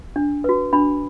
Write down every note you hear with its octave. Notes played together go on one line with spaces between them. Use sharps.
D4
F#4 B4
D4 B5